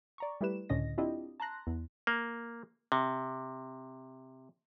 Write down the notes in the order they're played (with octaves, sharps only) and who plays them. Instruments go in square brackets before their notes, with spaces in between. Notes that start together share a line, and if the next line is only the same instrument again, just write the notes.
[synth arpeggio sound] D5 A#5 C#6
G3 A3 E4 G4 B4 E7
C#2 A2 D3 C#4 D#5 A#6
C4 D4 E4 F4 G4 D#5
A5 A#5 C6 F#6 A#6
E2
[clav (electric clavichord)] A#3
C3